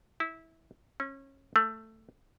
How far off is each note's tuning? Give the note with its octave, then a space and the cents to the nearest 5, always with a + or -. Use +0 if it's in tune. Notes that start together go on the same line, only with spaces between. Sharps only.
E4 -20
C#4 -25
A3 +10